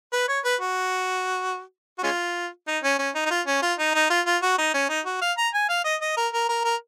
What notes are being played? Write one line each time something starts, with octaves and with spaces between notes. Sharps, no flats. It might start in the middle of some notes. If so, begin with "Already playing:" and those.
B4
C#5
B4
F#4
F#4
G#3 C#4 F4
D#4
C#4
C#4
D#4
D#4
F4
C#4
F4
D#4
D#4
F4
F4
F#4
D#4
C#4
D#4
F#4
F5
A#5
G#5
F5
D#5
D#5
A#4
A#4
A#4
A#4